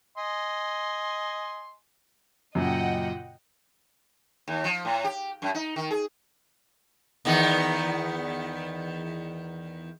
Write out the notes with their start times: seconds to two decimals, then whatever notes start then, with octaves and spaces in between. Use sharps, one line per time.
0.18 D#5 G#5 C6
2.55 F#2 A#2 C#3 D#5 F#5 G5
4.48 D#2
4.64 F3
4.85 A2
5.04 G4
5.42 F#2
5.55 D#4
5.76 D#3
5.91 G#4
7.25 E2 D#3 B3